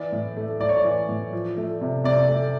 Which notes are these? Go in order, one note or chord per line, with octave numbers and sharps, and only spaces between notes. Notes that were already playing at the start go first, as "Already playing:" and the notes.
Already playing: E3 D5
A2
A3
A2 D5
C#5
D5
E3
A2
F3
A3
C3
C3 D5
A3